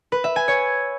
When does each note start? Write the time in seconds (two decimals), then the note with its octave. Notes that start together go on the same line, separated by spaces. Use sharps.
0.12 B4
0.24 E5
0.36 G#5
0.48 C#5